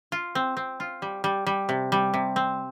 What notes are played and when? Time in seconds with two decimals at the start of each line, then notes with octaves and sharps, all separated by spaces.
0.12 F4
0.35 C4
0.57 C4
0.80 F4
1.02 G3
1.24 G3
1.47 G3
1.69 C3
1.92 G3
2.14 C3
2.36 C4